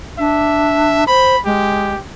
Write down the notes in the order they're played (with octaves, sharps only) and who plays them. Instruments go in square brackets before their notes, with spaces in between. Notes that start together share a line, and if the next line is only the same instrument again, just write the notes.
[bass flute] D4 [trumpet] E5
[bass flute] C5 [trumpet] B5
[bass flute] G#3 [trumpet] G4